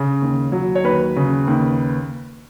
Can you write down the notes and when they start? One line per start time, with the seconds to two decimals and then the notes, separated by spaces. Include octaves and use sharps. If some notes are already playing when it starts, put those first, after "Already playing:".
Already playing: C#3
0.22 D#2
0.52 F#3
0.75 C#5
0.84 D#2 B4
1.16 C#3
1.47 D#2